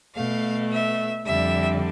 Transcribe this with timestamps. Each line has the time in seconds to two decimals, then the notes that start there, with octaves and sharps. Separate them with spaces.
0.17 B2 A3 F5
0.71 E5
1.27 F2 D3 G3 E5